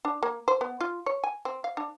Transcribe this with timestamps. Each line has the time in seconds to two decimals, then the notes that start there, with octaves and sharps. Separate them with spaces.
0.05 D4
0.23 A#3
0.48 C5
0.61 B3
0.81 F4
1.06 C#5
1.24 G#5
1.45 C4
1.64 F5
1.77 D4